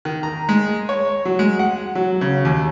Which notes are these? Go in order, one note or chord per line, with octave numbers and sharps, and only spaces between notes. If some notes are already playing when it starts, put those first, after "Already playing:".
D#3
A#5
G#3
C#5
F#3
G#3
F#5
F#3
C#3
D#2